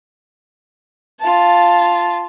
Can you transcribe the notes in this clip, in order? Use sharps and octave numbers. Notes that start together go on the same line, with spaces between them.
F4 A5